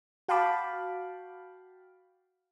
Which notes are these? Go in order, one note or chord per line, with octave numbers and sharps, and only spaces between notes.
F#4 F5 G5 A5 B5 D6